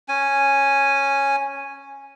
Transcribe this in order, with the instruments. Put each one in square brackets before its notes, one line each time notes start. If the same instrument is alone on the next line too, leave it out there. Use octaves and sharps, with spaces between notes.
[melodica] C#4 G#5